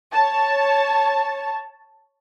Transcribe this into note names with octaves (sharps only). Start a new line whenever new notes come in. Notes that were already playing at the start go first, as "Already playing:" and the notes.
C#5 A5